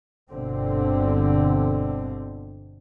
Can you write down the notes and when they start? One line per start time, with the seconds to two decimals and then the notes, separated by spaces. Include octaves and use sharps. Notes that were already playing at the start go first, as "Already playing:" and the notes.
0.31 G1 B2 D3 C4